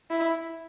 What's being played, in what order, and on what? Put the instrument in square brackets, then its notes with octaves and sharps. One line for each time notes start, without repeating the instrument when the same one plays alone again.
[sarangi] E4